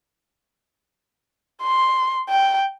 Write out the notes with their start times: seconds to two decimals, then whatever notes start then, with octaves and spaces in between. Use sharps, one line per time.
1.62 C6
2.29 G5